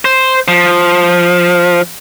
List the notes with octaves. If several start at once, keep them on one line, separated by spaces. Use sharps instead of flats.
C5
F3